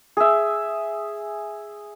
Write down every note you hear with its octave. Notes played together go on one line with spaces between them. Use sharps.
G#4 E5